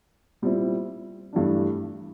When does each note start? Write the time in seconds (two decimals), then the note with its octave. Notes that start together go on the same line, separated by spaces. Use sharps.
0.42 A#2 G3 C4 E4
1.33 G2 E3 A3 D4